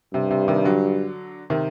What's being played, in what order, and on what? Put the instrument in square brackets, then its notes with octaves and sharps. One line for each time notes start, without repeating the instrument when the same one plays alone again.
[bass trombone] G2 [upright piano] C3
[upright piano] C3
C3 D#3
D3 F#3
C3 D#3